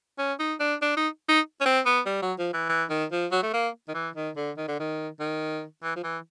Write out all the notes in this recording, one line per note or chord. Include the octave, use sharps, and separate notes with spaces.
C#4
D#4
D4
D4
D#4
D#4
C#4
C4
B3
G3
F#3
F3
E3
E3
D#3
F3
F#3
A3
A#3
D#3
E3
D#3
D3
D#3
D3
D#3
D#3
E3
F3
E3